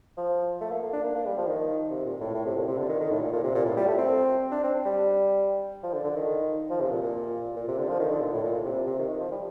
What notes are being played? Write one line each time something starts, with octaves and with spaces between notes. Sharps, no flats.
F3
A3
A#3
A#3
D4
A#3
A#3
G3
F3
D#3
C3
A#2
A2
A2
C3
A#2
C3
D3
D#3
D#3
A2
A#2
A#2
C3
A#2
A2
G3
A3
C4
D4
C4
G3
F3
D3
D3
D#3
F3
C3
A#2
A#2
A#2
C3
D3
F3
D#3
D3
A#2
A2
A#2
C3
C3
D#3
D#3
F3
G3